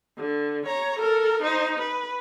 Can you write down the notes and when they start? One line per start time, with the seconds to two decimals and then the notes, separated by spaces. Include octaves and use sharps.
0.17 D3
0.66 C#5 A#5
0.99 A4 A#4
1.43 D#4 C5
1.78 B4